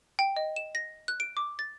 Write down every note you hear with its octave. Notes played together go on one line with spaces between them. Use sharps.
G5
D#5
E7
A#6
F#6
D7
D6
A6